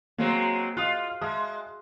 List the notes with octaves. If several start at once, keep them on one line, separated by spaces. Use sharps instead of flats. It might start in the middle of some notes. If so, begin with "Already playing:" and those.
F#3 G#3 A#3 C4
F4 D#5 D#6 F#6
G#3 E5 A5 D#6